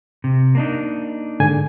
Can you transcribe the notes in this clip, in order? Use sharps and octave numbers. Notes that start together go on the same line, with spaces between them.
C3
A#3 D4 D#4
G#2 D3 G#5